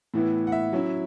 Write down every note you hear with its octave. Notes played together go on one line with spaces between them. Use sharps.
A2 E3 B3 E4
F#5
E5
F#3 C#4 E4